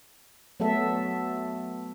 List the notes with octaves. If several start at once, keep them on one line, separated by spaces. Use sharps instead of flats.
F#3 A3 B3 A4 E5